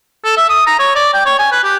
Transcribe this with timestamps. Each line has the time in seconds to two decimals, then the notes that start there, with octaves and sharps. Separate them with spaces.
0.25 A4
0.37 E5
0.50 D#6
0.67 A#5
0.79 C#5
0.95 D5
1.14 G5
1.26 C#5
1.39 G#5
1.52 B4
1.64 G4